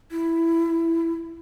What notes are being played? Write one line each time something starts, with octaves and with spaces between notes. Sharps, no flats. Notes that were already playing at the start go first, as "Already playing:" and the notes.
E4